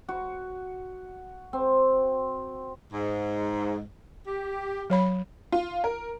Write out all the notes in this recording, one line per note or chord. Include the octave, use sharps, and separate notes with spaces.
F#4
C4
G#2
G4
F#3 C#5 B5
F4
A#4